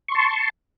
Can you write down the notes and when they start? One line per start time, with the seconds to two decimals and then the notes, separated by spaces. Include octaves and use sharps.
0.08 C#6
0.12 C6
0.15 A5